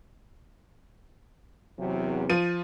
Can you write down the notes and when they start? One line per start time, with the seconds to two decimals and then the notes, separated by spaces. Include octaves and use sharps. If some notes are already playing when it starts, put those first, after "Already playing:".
1.79 E2 C3 F#3
2.30 F3 D#7